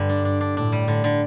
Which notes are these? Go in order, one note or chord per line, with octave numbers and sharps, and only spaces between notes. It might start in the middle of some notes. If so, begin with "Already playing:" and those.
Already playing: G2 D3 G3
D4
D4
D4
A2 D4
G3
D3
D3